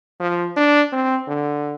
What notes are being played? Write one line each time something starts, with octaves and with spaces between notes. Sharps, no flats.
F3
D4
C4
D3